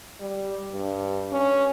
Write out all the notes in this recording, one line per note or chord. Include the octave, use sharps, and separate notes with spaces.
G3
G2
C#4